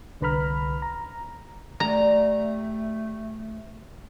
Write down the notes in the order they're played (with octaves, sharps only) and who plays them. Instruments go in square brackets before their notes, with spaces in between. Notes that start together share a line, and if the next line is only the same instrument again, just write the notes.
[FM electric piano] C2 D3 B4 A#5 B5 F6
A#5
[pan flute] A3 [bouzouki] G4 D5 [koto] A#5